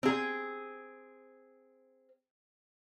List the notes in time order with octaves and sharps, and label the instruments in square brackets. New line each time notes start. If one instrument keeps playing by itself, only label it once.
[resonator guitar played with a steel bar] C4 G#4